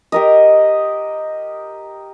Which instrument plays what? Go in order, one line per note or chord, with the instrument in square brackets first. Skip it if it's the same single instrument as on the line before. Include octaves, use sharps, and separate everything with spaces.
[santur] G4 A#4 D#5